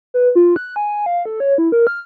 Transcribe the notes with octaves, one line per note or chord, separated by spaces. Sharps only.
B4
F4
F#6
G#5
F5
A4
C#5
E4
A#4
F6